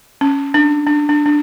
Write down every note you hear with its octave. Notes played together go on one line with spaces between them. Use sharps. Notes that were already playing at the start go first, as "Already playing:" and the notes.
C#4
D4
D4
D4
D4